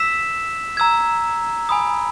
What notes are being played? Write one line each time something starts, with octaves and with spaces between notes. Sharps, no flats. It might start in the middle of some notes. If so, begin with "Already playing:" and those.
Already playing: E6 B6 E7
A#5 E6 G#6
G#5 B5 D#6